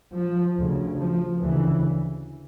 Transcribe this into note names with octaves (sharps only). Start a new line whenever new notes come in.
F3
D2 C#3
F3
D2 C#3 E3